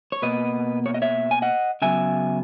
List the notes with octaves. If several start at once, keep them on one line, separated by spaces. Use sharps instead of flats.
C#5
B2 A#3 B4 D#5
C#5
D#5
C#5 E5
G#5
D#5 F#5
C#3 F#3 B3 E5 G#5